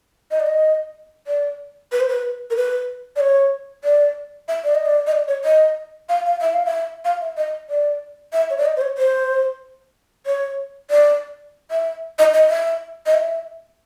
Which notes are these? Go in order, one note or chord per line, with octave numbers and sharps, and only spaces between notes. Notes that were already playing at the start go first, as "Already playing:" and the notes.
D#5
D5
D#5
D5
B4
C5
B4
A#4
B4
D5
C#5
D5
E5
D5
D#5
D5
D#5
D5
C#5
D#5
F5
F5
E5
F5
E5
F5
E5
D#5
D5
E5
C#5
D5
D#5
C5
C#5
C5
C#5
D5
E5
D#5
D#5
E5
D#5
E5